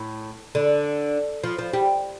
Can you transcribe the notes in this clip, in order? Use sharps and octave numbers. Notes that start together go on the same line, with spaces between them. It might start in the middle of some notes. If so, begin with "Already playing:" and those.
Already playing: A2
D3
F3
F3
G3